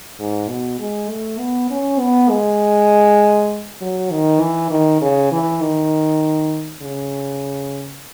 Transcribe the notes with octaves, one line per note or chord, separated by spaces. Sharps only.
G#2
B2
G#3
A3
B3
C#4
B3
G#3
F#3
D#3
E3
D#3
C#3
E3
D#3
C#3